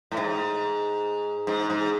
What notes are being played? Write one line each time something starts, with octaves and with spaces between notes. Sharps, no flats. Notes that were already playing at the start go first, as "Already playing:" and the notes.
A2
G#2
G#2
G#2